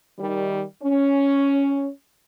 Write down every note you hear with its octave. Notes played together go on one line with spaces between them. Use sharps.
D#3 G3
C#4